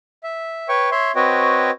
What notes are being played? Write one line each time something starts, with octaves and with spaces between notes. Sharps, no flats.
E5
B4 C#5 G5 C#6
C#5 E5 C6
C4 F#4 B4 C#5 D#5 G5